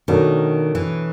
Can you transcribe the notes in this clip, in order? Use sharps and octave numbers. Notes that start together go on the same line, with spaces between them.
B2 D#3 F#3 A3 D4 F#4
E3